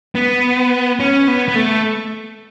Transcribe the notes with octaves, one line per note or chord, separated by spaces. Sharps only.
B3
C#4
B3
B3
A3